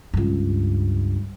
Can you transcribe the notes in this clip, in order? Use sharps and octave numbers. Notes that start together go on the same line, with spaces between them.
C#2 G2